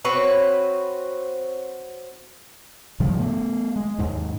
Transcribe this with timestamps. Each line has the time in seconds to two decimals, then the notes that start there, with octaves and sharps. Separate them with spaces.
0.05 C4 F#4 B4 C#5
3.00 G#2 C#3 F3 G3
3.18 A3 B3
3.76 G#3
3.98 D#2 G#2